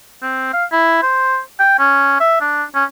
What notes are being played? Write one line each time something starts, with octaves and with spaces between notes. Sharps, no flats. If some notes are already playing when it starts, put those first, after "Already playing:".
C4
F5
E4
C5
G5
C#4
E5
D4
C#4